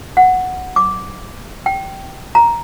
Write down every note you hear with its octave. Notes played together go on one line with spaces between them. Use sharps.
F#5
D6
G5
A#5